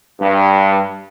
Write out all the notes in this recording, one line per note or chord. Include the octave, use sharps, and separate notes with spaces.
G2